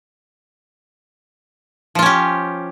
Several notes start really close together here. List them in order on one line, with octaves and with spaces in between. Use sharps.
F3 F4 C#4 G4